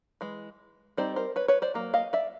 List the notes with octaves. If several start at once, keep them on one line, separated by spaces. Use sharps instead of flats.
E3 G#3
G3 C4 D#4 C5 D5
A#4 C5
B4 C#5
B4 C#5
C5 D5
F#3 A#3
D#5 F5
D5 E5